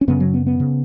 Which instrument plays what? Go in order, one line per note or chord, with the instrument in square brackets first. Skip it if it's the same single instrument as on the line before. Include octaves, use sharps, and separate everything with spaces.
[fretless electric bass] C#4
F#2 C#3 B3
F#3
B3
B3
C#3